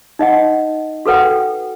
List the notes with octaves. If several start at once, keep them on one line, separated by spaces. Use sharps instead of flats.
D#4 D#5 F#5
F#4 A4 B4 F#5 G5